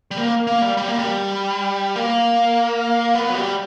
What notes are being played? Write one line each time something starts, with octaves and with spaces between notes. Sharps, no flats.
G3
A#3
A#3
G3
G3
A#3
G3
A#3
B3
F#3
G3